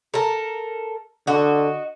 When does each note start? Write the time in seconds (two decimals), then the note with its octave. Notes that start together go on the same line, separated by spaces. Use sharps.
0.14 A4 A#4
1.27 D3 F#4 D#5